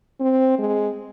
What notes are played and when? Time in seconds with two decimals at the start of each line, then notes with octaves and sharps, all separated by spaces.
0.20 C4
0.59 G#3